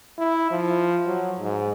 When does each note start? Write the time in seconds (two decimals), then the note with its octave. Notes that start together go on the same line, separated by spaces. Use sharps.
0.18 E4
0.51 F3
1.07 F#3
1.40 G#2